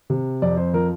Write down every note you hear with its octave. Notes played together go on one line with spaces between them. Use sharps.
C3
F2 D5
C5
F3 A#4